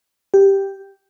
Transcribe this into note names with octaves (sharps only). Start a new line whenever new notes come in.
G4